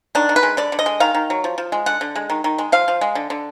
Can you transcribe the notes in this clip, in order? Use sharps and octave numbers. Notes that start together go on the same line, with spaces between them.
D#3 D4
D#3
B4
G#3
D3 D5
D3
D#5
G#3
D#3 F5
D#3
F#3
F3
F3
G#3
D3 F#5
D3
G#3
D#3
D#3
G#3
F3 F5
F3
G#3
D3
D3